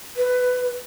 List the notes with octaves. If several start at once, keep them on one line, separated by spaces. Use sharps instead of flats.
B4